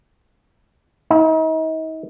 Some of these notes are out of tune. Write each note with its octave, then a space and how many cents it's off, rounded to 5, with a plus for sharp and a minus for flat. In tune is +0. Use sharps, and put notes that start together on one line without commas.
D#4 +40